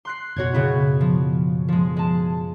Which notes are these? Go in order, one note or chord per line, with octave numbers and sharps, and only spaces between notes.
C6 F#6 C7
F#1 B2 F#4 C#5 G#6
C#3 B3 E4
F3
F3 G#3
G#3 A5